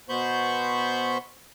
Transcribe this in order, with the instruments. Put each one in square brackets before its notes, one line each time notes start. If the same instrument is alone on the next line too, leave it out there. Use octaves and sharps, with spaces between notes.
[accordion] B2 B3 C5 B5 C#6 G6